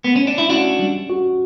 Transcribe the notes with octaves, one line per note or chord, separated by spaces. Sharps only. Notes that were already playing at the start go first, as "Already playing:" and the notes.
B3
C#4
D4
E4
C#4 D4 F#4
G3
F#4